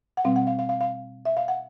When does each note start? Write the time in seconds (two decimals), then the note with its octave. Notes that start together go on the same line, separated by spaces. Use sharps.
0.17 F#5
0.24 B2 G3 C4 F5
0.36 F#5
0.47 F5
0.59 F5
0.69 F5
0.81 F5
1.25 E5
1.37 F5
1.48 F#5